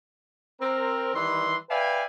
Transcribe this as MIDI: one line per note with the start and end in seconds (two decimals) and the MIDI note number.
0.61 1.13 60
0.61 1.13 70
1.14 1.56 51
1.14 1.56 52
1.14 1.56 55
1.14 1.56 84
1.69 2.04 71
1.69 2.04 74
1.69 2.04 76
1.69 2.04 77
1.69 2.04 79
1.69 2.04 80